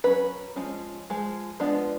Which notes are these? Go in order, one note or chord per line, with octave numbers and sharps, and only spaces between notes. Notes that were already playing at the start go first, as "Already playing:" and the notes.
F#3 C#4 B4
F3 G#3 C#4
F3 G#3
F3 G#3 B3 D4